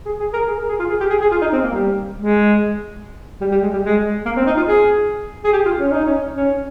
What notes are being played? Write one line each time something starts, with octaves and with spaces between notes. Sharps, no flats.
G#4
G#4
A#4
G#4
A#4
G#4
F4
G#4
G4
G#4
G#4
F4
D#4
C4
A#3
G3
G#3
G3
G3
G#3
G3
G#3
A#3
C4
D#4
F4
G#4
G#4
G4
F4
C#4
D#4
C#4
C#4